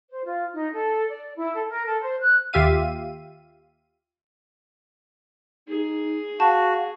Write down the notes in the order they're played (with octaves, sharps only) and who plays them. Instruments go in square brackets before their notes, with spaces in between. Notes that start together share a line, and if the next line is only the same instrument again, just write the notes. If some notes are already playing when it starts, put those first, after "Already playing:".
[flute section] C5
F4
D#4
A4
D5
E4
A4
A#4
A4
C5
F#6
[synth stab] D#2 F4 G4 E5 F5 D#7
[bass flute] D#4 [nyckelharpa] G#4
[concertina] F#4 [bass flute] F5 [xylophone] A5